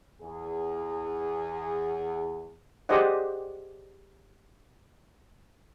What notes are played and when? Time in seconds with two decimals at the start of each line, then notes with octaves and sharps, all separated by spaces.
0.21 E2 G#4
2.89 G4 G#4 C5 D5 D#5 F#5